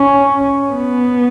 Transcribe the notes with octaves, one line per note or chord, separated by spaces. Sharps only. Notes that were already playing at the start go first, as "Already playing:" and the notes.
Already playing: C#4
B3